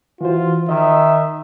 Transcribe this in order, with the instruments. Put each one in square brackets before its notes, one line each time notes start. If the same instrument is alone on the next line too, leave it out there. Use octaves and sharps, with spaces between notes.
[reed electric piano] E3 F#4 C5 [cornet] F4
[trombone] D#3 [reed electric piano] D#5 [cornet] E5